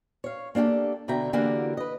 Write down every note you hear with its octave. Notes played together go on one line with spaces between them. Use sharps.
C#5 F5
A#3 D4 F4 G4 A4
B2 D3 E5 G5 A#5
D3 E3 A#3 F#4 G4 A#4
B4 D#5